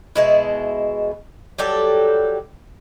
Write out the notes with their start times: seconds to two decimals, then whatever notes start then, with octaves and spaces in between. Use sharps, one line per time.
0.16 B2 G#3 E4
1.58 F#3 G3 G4 A4